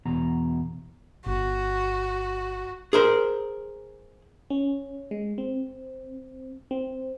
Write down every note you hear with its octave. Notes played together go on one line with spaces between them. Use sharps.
E2 B2 A#5
G1 F#4
G#4 A#4 C5
C#4
G#3
C4
C4